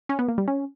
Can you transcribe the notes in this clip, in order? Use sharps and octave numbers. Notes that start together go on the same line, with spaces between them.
C#4
B3
A#3
G3
C#4